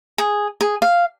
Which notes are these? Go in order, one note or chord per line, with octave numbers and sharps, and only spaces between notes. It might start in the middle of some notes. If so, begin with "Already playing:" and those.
G#4
G#4
F5